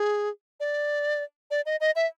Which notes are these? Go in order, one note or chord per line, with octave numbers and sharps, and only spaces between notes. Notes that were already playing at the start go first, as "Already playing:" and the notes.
Already playing: G#4
D5
D5
D#5
D#5
E5